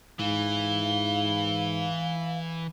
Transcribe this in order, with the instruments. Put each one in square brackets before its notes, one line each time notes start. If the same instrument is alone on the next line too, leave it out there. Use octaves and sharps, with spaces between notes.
[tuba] G#2 [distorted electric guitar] E3 [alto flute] F5 [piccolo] G7